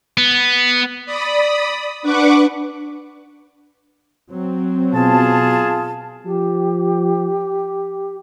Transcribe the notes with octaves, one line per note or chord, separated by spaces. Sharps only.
B3
D5 B5 D#6
D4 B4 F#5 C#6 D6
F#3 C4
B2 F4 G#4 A5
F3 G4